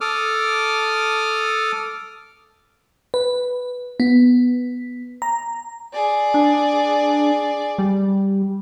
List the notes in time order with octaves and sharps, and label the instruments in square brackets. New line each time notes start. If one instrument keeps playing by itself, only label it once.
[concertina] A4 D6 D#6 F6
[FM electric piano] B4
B3
A#5
[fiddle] G#4 D5
[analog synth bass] D4
G3